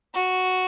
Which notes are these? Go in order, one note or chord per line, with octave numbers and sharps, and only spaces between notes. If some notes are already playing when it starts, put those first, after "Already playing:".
F#4